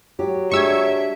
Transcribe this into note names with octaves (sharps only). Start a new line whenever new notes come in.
F#3 G4
G#3 D4 G4 E5 C#6 E6 G#6